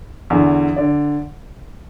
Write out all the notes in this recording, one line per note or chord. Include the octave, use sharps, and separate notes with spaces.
E2 D3
D3 D5